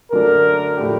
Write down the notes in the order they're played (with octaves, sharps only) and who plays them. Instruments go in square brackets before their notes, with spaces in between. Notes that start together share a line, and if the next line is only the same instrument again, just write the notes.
[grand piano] F#2 D3 F#3 A3 D4 [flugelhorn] A#4
[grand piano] A2 F3 A3 D4 G4